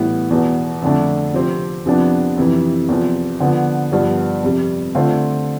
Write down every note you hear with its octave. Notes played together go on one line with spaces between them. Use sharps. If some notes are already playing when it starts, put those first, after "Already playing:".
Already playing: A2 E3 G3 B3
E2 B2 B3
F2 D3 A3 D4
C3 F3 C4 G4
F2 C3 F3 B3 D4
F2 C3 E3
E2 C3 F3
D3 F3 B3
G2 F3 B3
F2 C3 G3
D3 A3 C4 F4